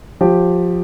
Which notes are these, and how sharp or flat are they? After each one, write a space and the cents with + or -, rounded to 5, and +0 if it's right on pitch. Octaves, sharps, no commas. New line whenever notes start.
F3 +20 G4 +0